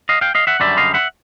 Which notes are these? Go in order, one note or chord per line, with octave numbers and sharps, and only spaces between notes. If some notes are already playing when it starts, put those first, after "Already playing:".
D#5 F5
F5 G5
D#5 F5
E5 F#5
F#2 D3 G3 D5 E5
D#5 F5
E5 F#5